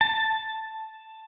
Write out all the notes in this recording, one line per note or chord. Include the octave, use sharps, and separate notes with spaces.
A5